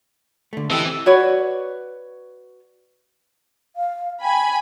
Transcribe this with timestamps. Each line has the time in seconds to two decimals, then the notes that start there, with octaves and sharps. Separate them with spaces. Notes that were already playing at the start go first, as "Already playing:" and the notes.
0.53 D3 A3
0.70 E3 C4 E4 G4 A4 D#5 E5
1.06 F#4 B4 C#5 D5
3.76 F5
4.22 G5 G#5 B5